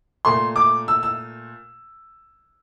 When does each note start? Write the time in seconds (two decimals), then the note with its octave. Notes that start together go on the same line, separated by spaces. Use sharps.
0.25 A#2 A3 C6
0.56 D6
0.88 E6
1.03 E6